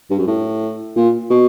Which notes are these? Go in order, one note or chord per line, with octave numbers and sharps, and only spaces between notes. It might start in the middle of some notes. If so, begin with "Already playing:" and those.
G2
F#2
A2
A#2
B2